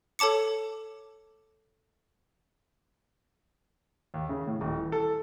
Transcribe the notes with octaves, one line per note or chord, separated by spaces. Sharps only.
A4 C#5 A5 D6 C#7
D#2
C#3
A2
D#1
E3
A4